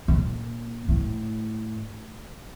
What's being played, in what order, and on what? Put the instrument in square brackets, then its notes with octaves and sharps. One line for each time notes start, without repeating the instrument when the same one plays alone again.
[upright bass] A#2
A2